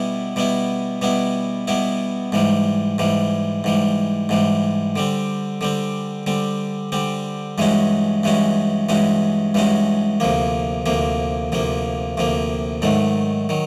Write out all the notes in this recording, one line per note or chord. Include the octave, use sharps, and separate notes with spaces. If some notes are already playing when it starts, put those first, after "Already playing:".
Already playing: B2 G3 B3 E4
B2 G3 B3 E4
B2 G3 B3 E4
B2 G3 B3 E4
G#2 E3 G3
G#2 E3 G3
G#2 E3 G3
G#2 E3 G3
D3 G3 C4
D3 G3 C4
D3 G3 C4
D3 G3 C4
G2 E3 G#3 C#4 F#4
G2 E3 G#3 C#4 F#4
G2 E3 G#3 C#4 F#4
G2 E3 G#3 C#4 F#4
D2 C3 F3 A#3
D2 C3 F3 A#3
D2 C3 F3 A#3
D2 C3 F3 A#3
G#2 D#3 F#3 A3
D#3 F#3